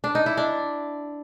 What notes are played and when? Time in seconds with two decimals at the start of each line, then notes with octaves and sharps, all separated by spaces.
0.04 D4
0.15 D#4
0.26 E4
0.37 D4